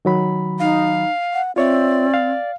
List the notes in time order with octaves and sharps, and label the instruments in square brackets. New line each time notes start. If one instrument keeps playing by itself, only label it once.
[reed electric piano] D#3 F#3 B5
[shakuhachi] D#4 [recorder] F5
[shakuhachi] F#5
[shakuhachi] C4 [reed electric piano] F4 C#5 E5 [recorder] D5
[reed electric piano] F5